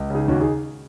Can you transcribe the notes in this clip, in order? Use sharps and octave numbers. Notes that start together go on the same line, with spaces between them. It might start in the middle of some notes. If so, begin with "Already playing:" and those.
Already playing: C#2
C#3 D#4 G#4
D#2 C#4 F#4
D#4 G#4